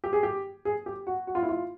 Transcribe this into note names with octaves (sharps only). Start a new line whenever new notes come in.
G4
G#4
G4
G#4
G4
F#4
F#4
F4
E4
F4